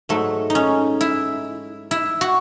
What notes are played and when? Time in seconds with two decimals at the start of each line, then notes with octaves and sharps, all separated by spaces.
0.09 G#2 F#3 A3
0.50 D#4
0.55 C#4
1.01 E4
1.91 E4
2.21 F#4